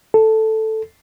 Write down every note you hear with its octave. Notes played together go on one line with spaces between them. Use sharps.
A4